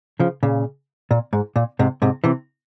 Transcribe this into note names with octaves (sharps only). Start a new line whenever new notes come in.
C#3 F3
A#2 C#3
A#2
G#2
A#2
G#2 C3
G#2 C3
C3 E3